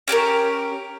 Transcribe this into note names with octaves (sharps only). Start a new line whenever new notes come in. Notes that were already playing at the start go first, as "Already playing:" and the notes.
C#4 G4 A4 A#4